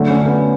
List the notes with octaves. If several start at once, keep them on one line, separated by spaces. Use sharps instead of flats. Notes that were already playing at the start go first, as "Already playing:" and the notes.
Already playing: D3 F#3 A3
C#4
B3